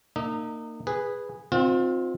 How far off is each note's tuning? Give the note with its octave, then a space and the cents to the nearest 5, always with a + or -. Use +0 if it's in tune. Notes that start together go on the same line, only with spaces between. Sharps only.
A#3 -20 D#4 -30 E5 -45
G#4 -10 B4 +0
D#3 +45 C4 +0 F4 +35